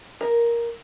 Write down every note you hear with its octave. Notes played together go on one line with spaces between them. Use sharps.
A#4